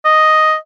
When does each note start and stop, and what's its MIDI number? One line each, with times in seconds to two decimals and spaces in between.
0.05 0.55 75